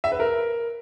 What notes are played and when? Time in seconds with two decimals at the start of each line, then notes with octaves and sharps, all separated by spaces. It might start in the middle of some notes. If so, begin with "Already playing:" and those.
0.04 E5
0.12 B4
0.20 A#4